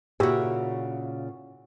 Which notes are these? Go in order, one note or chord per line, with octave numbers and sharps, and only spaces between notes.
A#2 C#3 E4 F#4 G4 E5